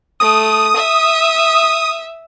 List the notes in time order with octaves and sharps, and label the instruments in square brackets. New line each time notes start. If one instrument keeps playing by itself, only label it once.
[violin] A3 [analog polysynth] D#6
[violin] E5